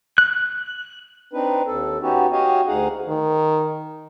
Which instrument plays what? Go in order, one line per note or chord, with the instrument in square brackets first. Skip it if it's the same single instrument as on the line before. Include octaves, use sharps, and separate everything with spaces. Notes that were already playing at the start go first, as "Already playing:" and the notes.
[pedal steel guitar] F#6
[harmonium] C4 D4 D#4 B4
D#2 A4
B3 C#4 D#4 F#4 G4
F#4 G4 C#5 D#5 F5 G#5
D2 D#4 G#4 F5 F#5
[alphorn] D#3